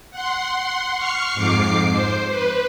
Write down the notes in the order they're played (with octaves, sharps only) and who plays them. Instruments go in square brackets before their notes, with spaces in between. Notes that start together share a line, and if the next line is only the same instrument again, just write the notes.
[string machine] F#5 C6
C#6 F6 C7
F2 G#2 D6 C7
C5
B4